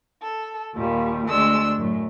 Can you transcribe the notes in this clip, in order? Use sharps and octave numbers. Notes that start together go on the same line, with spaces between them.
A4
D#2 A#2 G3
D2 G#3 D4 C6 E6
F#2 A2